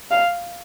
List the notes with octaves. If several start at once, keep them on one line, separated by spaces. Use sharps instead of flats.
F5